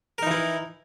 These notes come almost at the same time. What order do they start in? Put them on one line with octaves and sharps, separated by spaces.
A#4 D#4 E3 E4